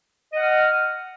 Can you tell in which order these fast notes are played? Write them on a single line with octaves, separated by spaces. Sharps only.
D#5 F#5 F6